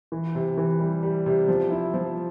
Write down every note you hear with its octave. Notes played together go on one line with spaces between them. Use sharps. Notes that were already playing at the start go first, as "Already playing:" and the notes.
E3
C3
E3
G3
G3
C3
F3
E4
F3